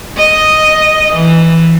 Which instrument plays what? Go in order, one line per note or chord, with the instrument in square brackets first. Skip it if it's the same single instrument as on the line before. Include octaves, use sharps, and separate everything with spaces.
[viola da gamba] D#5
E3